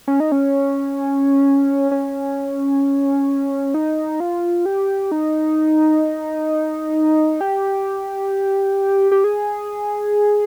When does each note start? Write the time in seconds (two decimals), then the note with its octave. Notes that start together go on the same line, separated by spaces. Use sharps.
0.08 C#4
0.20 D#4
0.32 C#4
1.91 C#4
3.74 D#4
4.20 F4
4.66 G4
5.12 D#4
7.41 G4
9.12 G4
9.24 G#4